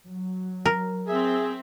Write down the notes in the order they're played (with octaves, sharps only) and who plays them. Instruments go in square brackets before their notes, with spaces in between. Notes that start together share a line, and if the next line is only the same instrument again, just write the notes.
[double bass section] F#3
[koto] A#4
[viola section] C4 E5 [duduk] G#4